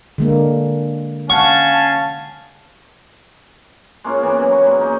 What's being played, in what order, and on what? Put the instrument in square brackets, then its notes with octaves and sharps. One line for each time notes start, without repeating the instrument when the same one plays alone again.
[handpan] D3 G#3 A#3
[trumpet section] C#4 F5 A5 [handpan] F#5 [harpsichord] C#6
[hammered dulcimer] G#3 A#3 C#4 F4
E3 A#3 B3 C#4
F#3
C#5 C#6
A#2 G#3
D#4